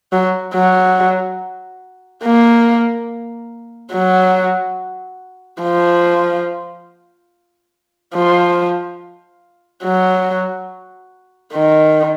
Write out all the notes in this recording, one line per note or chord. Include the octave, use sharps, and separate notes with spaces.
F#3
F#3
A#3
F#3
F3
F3
F#3
D#3